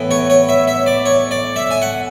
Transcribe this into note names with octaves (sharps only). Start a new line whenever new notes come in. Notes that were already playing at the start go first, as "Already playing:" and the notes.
Already playing: A2 E3 B3
C#5
C#5
E5
E5
D5
C#5
D5
E5
G#5
F#5